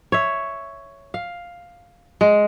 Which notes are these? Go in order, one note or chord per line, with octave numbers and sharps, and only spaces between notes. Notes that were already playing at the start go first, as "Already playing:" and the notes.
C#5 E5
F5
G#3